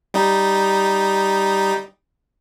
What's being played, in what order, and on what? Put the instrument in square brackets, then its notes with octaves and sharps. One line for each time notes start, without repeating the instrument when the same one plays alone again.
[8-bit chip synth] G3 D#4